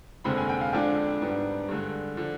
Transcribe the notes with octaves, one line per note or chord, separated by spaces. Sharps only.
F1 D#2 D3 G#3 C4 B5
G#5
G5
F5
F2 D3 G#3 D4 G5
G#2 G3 B3 D4
G2 D3 G#3
D3 F3